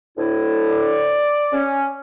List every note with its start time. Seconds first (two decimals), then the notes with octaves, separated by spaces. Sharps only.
0.17 D2 A2 E4
0.71 D5
1.53 C#4